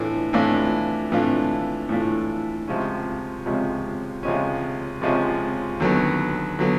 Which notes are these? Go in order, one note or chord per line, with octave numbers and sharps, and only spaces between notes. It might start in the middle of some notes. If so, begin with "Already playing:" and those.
Already playing: A2 E3 A3 D4 F4
A2 E3 A3 D4 F4
A2 E3 A3 D4 F4
A2 E3 A3 D4 F4
C#2 C3 F3 G#3 C#4
C#2 C3 F3 G#3 C#4
C#2 C3 F3 G#3 C#4
C#2 C3 F3 G#3 C#4
D#2 D3 F#3 B3
D3 F#3 B3